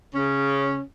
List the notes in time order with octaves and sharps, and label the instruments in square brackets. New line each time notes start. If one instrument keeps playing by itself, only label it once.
[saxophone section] C#3 C#4